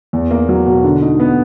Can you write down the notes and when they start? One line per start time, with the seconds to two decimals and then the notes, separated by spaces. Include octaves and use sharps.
0.13 E2
0.31 A#3
0.49 F#3
0.66 B2
0.84 D3
1.02 D#4
1.20 B3